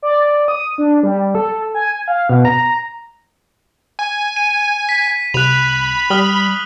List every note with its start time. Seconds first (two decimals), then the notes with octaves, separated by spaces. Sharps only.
0.02 D5
0.48 D#6
0.78 D4
1.03 G3
1.35 A4
1.75 G#5
2.08 F5
2.29 B2
2.45 A#5
3.99 G#5
4.36 D#7
4.89 B6
5.34 C2 B5 F#6 F7
6.10 G3 D#6 F6 F#7